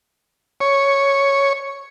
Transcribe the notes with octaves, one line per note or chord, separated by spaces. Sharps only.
C#5